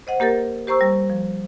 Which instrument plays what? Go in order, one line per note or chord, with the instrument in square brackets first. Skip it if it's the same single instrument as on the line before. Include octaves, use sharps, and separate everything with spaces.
[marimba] C5 D#5 F#5
A#3 G4 A#4 A6
G4 C5 A#5 C#6 E6
G3
F3